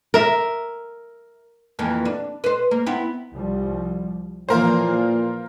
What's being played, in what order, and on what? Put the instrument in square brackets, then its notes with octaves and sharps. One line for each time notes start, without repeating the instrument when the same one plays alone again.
[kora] A#4 E5
[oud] F2 E3 A#3
D4
B4 C5
A#3
B3 C4 E4
[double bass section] C2 F3 G3
[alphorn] A#2 [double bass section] E3 F3 A#3 [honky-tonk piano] F4 A#4 C5